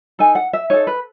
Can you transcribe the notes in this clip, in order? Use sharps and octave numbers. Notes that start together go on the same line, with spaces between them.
D#4 A4 G#5
F#5
E5
D#4 A4 C#5
B4